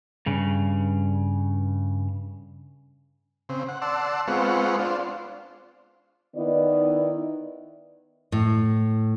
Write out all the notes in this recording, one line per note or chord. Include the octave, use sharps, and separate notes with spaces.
G2 C#3
C#3 C4
F#5
D5 F#5 A5 C6 E6
G#3 B3 C4 F4 F#5 C#6
D4 F4 C5
D#3 B3 D#4 E4 D5
A2